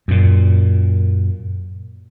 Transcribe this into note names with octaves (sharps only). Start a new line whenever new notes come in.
F#2 A#2